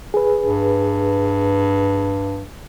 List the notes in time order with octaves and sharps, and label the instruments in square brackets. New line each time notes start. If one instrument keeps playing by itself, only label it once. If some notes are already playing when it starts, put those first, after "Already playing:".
[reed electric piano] G#4 B4
[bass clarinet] G2